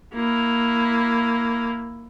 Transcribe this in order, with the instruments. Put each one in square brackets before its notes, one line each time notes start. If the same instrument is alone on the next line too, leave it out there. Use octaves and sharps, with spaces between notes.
[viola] A#3 E4